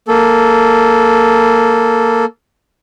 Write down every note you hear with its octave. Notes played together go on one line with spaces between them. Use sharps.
A#3 A4